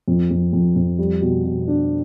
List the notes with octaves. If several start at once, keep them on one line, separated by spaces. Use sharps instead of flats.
F2
F2
F2
F2
G3
B2
B2
D4